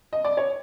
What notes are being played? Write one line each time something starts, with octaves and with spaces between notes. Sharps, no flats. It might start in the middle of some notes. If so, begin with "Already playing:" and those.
D#5
D5
C#5